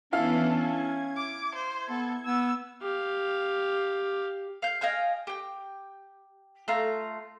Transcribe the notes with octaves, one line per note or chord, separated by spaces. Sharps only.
E3 B3 C#4 D4 E4 A4 F5
G#6
D6
C5
B3 A4
B3 E6
G4 F5
F5 G6
D#5 F5 G5 G#5
G4 G5
A3 F4 A#5